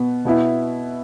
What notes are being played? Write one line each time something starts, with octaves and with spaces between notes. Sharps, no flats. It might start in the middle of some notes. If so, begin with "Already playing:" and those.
Already playing: B2 B3
B2 B3 E4